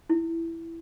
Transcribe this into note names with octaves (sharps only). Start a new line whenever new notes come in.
E4